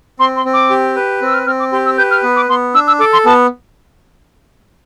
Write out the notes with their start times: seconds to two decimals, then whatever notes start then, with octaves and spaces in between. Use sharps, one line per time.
0.20 C4 C6
0.36 C6
0.45 C4
0.54 D6
0.70 G4
0.96 B4
1.22 C4 E6
1.34 F6
1.46 C4 F6
1.60 D6
1.72 G4 C6
1.85 E6
1.98 B4 G6
2.11 F6
2.23 B3
2.36 D6
2.49 B3 C6
2.75 D4 E6
2.87 E6
3.00 A4 D6
3.13 C6
3.25 B3 A5